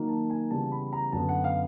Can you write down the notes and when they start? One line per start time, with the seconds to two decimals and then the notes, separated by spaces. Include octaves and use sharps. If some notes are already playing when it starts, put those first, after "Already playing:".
Already playing: D#3 F#3 A#3 D#4
0.09 A5
0.30 G#5
0.50 C#3 E3 G3 B3 A5
0.72 B5
0.93 A#5
1.12 F#2 D3 F#3 B3 A5
1.29 F#5
1.44 F5